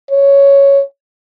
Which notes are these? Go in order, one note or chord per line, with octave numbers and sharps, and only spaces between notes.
C#5